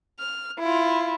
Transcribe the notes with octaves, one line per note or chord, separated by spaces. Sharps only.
F6
E4 F4